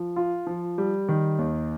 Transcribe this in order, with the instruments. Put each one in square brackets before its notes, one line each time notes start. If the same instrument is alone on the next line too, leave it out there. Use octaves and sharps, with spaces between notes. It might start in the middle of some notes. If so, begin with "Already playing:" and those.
Already playing: [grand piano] F3
F4
F3
G3
D#3
D#2